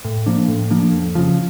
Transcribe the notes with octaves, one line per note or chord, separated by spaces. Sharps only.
A2
F3 A#3 D4
A2
F3 A#3 D4
F2
C#3 F3